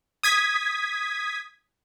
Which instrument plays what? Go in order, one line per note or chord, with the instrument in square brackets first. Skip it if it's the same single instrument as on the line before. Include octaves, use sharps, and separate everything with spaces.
[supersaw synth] D#6 G#6 B6